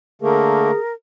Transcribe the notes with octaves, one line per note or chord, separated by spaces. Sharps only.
D3 A3 A#3 G#4 A#4